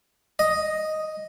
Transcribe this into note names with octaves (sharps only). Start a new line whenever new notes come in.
D#5